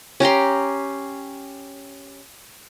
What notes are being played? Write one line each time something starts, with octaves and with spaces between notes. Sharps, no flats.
C#4 G4 A#5 C6